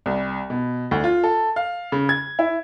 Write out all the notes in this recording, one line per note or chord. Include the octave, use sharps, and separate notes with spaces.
C2
B2
D2
F4
A4
F5
C#3
G#6
E4